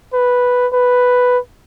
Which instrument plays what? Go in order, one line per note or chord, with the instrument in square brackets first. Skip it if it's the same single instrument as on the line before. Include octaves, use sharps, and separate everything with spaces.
[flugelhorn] B4
B4